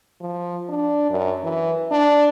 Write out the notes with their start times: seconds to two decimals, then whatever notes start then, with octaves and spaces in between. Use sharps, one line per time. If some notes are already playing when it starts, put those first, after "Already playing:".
0.20 F3
0.69 D4
1.10 F#2
1.43 E3
1.91 D4